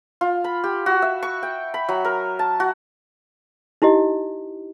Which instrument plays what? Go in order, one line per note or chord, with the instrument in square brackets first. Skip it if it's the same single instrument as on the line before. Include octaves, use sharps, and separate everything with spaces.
[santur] F4
B5
G4
F#4
E5
C#6
G5
B5
F#3
A#4
A5
F#4
[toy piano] D#4 E4 G4 D#5